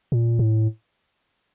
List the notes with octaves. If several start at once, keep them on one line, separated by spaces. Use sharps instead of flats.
A#2
A2